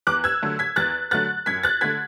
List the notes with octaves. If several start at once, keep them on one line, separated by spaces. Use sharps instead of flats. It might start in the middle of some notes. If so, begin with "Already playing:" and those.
E2 D6 F#6
E6 G#6
D3 F#3 A3
G#6 B6
E2 F#6 A6
D3 F#3 A3 F#6 A6
F#2 G#6 B6
F#6 A6
D3 A3 G#6 B6